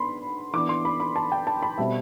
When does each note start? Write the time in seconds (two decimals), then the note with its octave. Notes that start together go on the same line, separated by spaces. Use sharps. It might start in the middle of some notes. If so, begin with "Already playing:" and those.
Already playing: B3 D4 B5 C6
0.53 E3 B3 D4 D6
0.69 C6
0.85 B5
1.00 B5
1.16 A5
1.32 G5
1.47 A5
1.62 B5
1.78 B2 G3 C4 E5